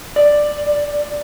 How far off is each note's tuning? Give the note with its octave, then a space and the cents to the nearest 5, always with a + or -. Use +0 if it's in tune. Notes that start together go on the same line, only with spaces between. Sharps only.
D5 +10